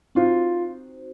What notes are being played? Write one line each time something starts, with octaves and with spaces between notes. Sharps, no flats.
C4 D#4 F4 F#4 C5